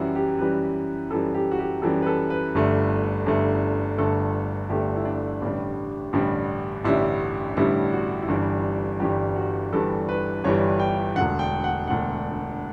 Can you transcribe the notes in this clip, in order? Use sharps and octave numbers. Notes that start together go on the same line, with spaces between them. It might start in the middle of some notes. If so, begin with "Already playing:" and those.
Already playing: F#2 E3 G3 E4 F#4
G4
F#2 E3 G3 B4
F#2 E3 G3 A4
G4
F#4
G4
F#2 E3 G3 A4
B4
A4
B4
G1 G2 D3 A3
G1 G2 D3 A3
G1 G2 D3 A3 A4
G1 G2 D3 A3 G4
E4
D4
A1 G2 D3 G3
A1 G2 D3 G3
A1 G2 D3 G3 E4
A1 G2 D3 G3 E4
F#4
E4
G1 G2 E3 G3 D4
G1 G2 E3 G3 G4
F#4
G1 G2 E3 G3 A4
B4
G1 G2 E3 G3 C#5
G5
E1 D2 D3 F#5
G5
F#5
E1 D2 D3 F#5